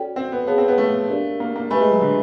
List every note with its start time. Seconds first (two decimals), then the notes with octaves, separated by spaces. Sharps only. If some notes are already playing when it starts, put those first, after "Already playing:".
Already playing: C#4 F#4 A4 D5 G5
0.16 C4
0.32 B3
0.47 B3 G#4 C#5 F5 A5
0.58 C4
0.68 B3
0.78 A3
1.09 D4 G4 A#4 D5 F5
1.40 A#3
1.56 A#3
1.70 A3 G4 B4 E5 G#5 B5
1.81 G#3
1.92 F#3
2.01 D3